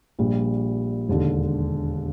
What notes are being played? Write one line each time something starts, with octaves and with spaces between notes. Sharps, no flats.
A#1 A#2 G3
E1 D#2 D3